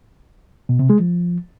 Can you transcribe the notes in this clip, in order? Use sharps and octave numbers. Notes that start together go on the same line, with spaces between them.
B2
C3
G#3
F3